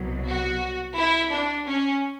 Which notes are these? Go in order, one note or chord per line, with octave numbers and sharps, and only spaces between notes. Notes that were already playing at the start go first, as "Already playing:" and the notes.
Already playing: C2 B2 F#3
F#4
E4
D4
C#4